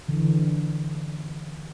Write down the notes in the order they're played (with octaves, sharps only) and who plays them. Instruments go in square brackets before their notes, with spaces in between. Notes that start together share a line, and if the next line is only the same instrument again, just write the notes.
[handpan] D3 E3